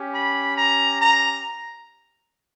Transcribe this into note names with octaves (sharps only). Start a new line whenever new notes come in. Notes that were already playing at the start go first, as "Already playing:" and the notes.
Already playing: C#4 G4
B5
A#5
A#5